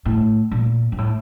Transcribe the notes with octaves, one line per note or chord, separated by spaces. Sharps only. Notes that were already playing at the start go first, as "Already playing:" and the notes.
A2
A#2
G#2
A2